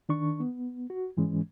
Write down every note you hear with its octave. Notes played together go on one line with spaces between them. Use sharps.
D#3 D4 C#6
B3
F#4
G#2 E3 G#3 C#4